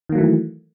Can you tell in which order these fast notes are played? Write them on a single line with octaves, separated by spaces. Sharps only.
D#3 A#3 F#3 A3 E3